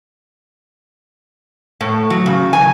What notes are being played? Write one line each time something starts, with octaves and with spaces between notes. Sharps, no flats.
A2
F#3
C#3
G#5